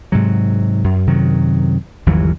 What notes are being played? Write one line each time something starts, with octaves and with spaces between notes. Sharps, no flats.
G#2 C3 F#3
F#2
F#2 C3 D#3 F#3
G1 D#2 E3 F#3